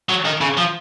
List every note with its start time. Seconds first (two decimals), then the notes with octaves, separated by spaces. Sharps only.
0.09 F#3
0.25 D#3
0.41 C#3
0.57 F3